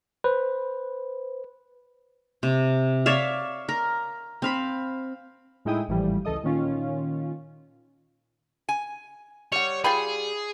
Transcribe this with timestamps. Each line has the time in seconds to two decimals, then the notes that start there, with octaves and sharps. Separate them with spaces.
0.24 B4 C5
2.43 C3
3.06 C#5 D5 E5 F5
3.69 A#4
4.42 C4 F5 B5
5.65 A2 G#3 D#4 E4 G5 D#6
5.88 G#1 A2 E3 F3 G3
6.25 C#2 E3 A4 D#5 D#6
6.43 A#2 D#3 C#4 F4
8.69 G#5
9.52 G3 C#5 F#5
9.84 F4 G#4 G5 B5